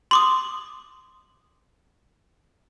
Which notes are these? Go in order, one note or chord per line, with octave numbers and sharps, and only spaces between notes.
C6 D6 D#6